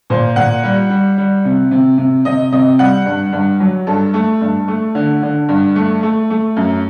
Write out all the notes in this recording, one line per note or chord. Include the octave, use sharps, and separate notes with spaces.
A#2 C5
A#2 F#5
G3
G3
G3
C3
C3
C3
C3 D#5
C3 D#5
G3 F#5
G2
G2
F#3
G2 A4
A3
G2
A3
D3
D3
G2
A3
A3
A3
F#2